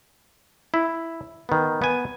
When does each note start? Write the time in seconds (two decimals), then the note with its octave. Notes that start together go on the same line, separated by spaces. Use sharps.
0.74 E4
1.49 D#3 B3
1.82 B3 G#5